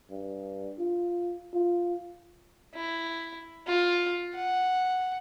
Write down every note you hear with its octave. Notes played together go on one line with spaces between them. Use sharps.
G2
F4
F4
E4
F4
F#5